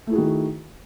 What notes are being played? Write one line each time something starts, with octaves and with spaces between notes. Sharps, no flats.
D#3 A3 E4 F#4 G#4